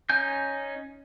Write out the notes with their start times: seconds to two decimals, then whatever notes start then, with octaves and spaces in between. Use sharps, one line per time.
0.10 C#4 D#4 G#5 G6